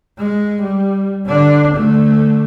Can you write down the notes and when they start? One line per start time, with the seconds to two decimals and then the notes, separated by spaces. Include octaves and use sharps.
0.18 G#3
0.63 G3
1.26 D3 D4
1.76 D3 A3